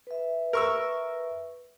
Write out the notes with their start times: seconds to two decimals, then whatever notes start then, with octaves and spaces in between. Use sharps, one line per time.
0.07 B4 E5
0.53 A#4 C#6 E6